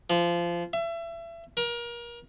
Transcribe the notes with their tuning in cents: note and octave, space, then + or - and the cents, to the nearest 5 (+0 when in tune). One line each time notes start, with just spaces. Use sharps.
F3 -20
E5 +30
A#4 +30